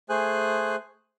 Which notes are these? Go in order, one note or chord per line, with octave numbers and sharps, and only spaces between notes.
A3 G#4 C5 G#5 F#6